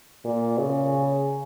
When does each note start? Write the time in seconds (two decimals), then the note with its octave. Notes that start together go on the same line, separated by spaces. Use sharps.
0.25 A#2
0.58 C#3